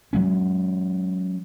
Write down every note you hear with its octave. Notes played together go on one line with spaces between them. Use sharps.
F#3 G#3 C#4